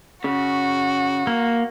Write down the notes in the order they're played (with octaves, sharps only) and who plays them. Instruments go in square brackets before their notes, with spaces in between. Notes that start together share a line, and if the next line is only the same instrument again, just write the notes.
[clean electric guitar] C#3 [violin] F#4
[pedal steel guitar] A#3